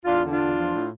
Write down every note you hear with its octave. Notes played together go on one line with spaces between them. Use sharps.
E2 D4 F4
D3
D4 F4
E2
F3
A2